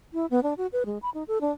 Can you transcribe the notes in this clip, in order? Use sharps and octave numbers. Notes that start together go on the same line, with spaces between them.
E4
B3
D4
F#4
B4
G#3
B5
D#4
A4
D4